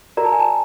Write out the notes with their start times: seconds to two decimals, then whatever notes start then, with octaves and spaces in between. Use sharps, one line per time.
0.17 F#4 A#4 D5 A#5
0.24 A5
0.32 G#5
0.40 A5